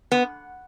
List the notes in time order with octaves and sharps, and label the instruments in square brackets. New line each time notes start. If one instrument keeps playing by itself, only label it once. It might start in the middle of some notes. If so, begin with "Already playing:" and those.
[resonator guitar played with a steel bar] B3